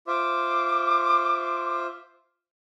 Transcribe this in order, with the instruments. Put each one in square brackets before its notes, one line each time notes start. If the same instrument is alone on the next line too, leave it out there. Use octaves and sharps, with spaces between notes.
[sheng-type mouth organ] F4 C5 E5 [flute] D6